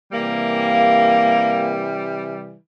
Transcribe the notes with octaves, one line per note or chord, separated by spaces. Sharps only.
C3 E3 G3 A#3